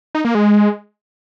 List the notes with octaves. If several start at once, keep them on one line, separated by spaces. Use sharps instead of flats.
D#4
A#3
G#3